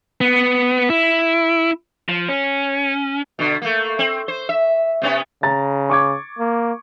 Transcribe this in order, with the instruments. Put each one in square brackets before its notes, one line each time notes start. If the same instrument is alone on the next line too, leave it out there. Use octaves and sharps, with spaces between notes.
[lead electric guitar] B3
E4
F3
C#4
[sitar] B2 D3
A3 A#3
C4
C5
E5
C3 B3 C#4
[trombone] C#3 [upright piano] A#5 A6
[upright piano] C#6 D6 G#6
[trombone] A#3